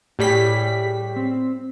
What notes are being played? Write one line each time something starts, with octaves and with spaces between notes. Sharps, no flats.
A2 G3 G4 G#4 B6
C4